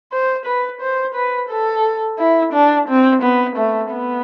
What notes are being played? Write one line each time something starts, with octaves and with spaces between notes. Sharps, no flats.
C5
B4
C5
B4
A4
E4
D4
C4
B3
A3
B3